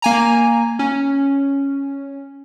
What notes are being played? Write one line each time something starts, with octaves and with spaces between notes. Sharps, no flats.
A#3 G#5 A#5
C#4